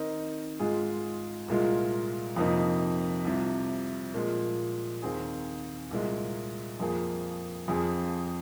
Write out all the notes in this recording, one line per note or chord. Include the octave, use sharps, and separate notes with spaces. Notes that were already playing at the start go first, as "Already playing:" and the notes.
Already playing: D#3 C4 D#4 A#4
G#2 G#3 F4 G#4
C2 A#2 G#3 F4
F2 C3 F3 A#3 D#4
C2 C3 F3
A#2 F3 G#3
D#2 D#3 C4 G#4
C2 A#2 G#3
F2 F3 A#3 G#4
F2 F3 C4 G#4